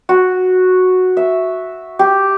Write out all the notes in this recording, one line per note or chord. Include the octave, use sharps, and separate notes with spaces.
F#4
E5
G4